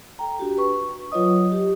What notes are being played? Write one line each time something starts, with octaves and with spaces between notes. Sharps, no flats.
A4 G5 A#5
D4 F#4 G4
B4 C#6
F#3 F4 B4 C#5 D#5 D#6
G4